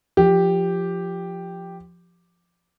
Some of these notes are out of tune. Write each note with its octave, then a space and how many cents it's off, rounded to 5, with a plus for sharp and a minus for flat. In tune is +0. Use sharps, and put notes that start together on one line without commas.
F3 +0 G4 +0